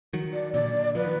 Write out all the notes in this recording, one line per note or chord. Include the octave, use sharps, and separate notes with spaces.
D#3 F#3
D5
A#2 D3 D5
F3 B4
D#3